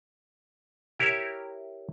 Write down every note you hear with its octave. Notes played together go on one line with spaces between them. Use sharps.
E4 G4 A#4 C#5 E5